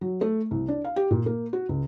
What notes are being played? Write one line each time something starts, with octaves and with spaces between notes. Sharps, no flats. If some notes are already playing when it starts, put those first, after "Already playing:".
F#3
A3
C2
D4
F5
G4
A#2
A#3
F#4
C#2